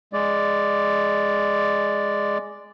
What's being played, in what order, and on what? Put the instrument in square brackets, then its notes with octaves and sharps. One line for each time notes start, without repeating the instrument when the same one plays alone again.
[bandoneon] G#3 D5